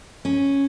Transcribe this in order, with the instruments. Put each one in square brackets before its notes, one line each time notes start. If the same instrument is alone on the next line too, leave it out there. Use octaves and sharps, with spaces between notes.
[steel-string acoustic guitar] C#4